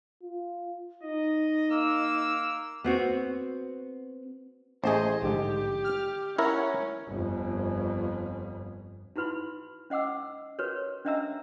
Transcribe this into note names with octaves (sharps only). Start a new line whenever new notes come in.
F4
D#4 D#5
A#3 E6
B3 C4 F#4
A1 A3 G#4 C5 D#5
A#1 G#2 D3 G4
F6
C#4 E4 A#4 C#5 F#5
G1 F2
D#4 E4 F#4 B4 B5 C6
C#4 D#5 F#5 D6 E6
F#4 A#4 B4 C#5
C#4 D4 D#5 E5 A#5 E6